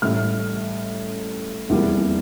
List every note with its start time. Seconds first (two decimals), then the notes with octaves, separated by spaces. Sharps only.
0.02 A1 A2 G3 F6
1.69 F1 E2 E3 G3 A#3